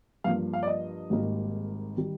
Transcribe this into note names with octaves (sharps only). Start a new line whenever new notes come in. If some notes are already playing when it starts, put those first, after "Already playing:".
G2 F3 A#3 F5
F5
D5
D#5
G#1 G#2 G3 A#3 D#4
D#3 G3